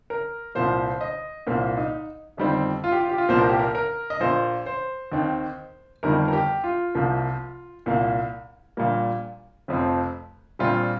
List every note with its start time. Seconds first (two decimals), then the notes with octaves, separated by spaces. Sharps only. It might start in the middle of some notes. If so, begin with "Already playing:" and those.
0.10 A#4
0.55 C2 A#2 F3 A#3 C5
0.90 C5
1.01 D#5
1.47 C2 A#2 A#3 C5
1.77 D#4
2.37 G1 F2 D#3 G3 C4
2.84 F4
2.92 G4
3.00 F4
3.09 G4
3.18 F4
3.29 C2 A#2 F3 A#3 C5
3.39 A#4
3.49 G4
3.59 A#4
3.75 A#4
4.10 D#5
4.20 A#1 A#2 A#3 C5
4.66 C5
5.12 D#2 D#3 C4
6.03 G1 F2 D#3 G3 A#4
6.28 A#4
6.33 G4
6.64 F4
6.95 C2 C3 F3 A#3
7.86 C2 A#2 A#3
8.77 A#1 A#2 G3 A#3
9.68 F1 F2 F3 C4
10.59 A#1 A#2 G3 C4 F4